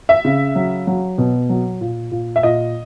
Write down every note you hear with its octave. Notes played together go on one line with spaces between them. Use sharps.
E5
C#3
F#3
F#3
B2
F#3
A#2
A#2
E5
A#2 D#5